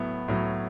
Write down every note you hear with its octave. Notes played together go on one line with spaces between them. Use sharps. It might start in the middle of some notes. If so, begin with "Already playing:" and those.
Already playing: A2 F#3 B3
A2 F#3